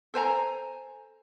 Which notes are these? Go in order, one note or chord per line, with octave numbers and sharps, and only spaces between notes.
A4 C5 G#5 A#5